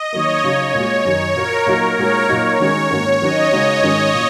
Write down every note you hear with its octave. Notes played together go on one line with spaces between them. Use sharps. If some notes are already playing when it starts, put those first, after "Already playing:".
Already playing: D#5
D#3 F#3 A#3 C#5
C#3 F#3 D#4 F#4
A#2 G#3 F#4
F#2 D#3 F#3 D#4
A#2 A#3 F#4 A#4
A#2 F#3 D#4 F#4
A#2 G#3 D#4 F#4 C#5
A#2 F#3 D#4 F#4 C#5
D#3 G#3 C#4 F#4 C#5
G#2 D#3 A#3 C#4 F#4
D#3 F#3 C#4 F#4 D#5
C#3 G#3 D#4 F#4
G#2 D#3 G#3 C#4 F#4
A#2